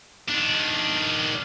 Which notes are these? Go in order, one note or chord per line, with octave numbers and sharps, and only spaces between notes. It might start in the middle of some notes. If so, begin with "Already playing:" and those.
D#3 D4